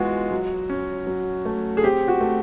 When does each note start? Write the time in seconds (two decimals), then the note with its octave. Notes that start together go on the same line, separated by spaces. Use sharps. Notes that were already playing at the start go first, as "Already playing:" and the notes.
Already playing: E3 G#3 B3 F4 F#4
0.31 F#3
0.70 C#4
1.07 F#3
1.45 A3
1.77 G#4
1.83 C4 G4
2.08 F#4
2.21 A3